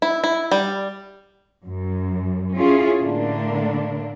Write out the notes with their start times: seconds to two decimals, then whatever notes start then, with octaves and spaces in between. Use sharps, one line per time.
0.02 E4
0.24 E4
0.51 G3
1.65 F#2
2.55 C#4 E4 F4 G#4
3.01 A2 D3 A3 A#3 D4